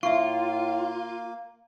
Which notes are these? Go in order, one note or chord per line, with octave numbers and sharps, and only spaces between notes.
A2 A#3 F4 E5 C#6